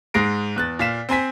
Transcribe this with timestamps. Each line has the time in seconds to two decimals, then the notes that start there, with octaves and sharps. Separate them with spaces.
0.14 G#2 G#3 A#6 C7 D7
0.56 E2 F#6 A6
0.79 A#2 F5 B6 E7
1.09 C4 C5 G#5 B6